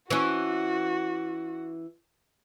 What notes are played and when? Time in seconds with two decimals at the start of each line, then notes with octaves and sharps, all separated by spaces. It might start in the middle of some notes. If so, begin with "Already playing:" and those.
0.10 E3 C#4 F#4